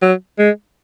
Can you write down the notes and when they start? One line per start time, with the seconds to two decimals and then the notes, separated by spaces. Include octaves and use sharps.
0.02 F#3
0.39 G#3